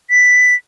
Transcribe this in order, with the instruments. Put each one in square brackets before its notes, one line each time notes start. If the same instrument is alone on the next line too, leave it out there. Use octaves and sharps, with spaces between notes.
[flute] B6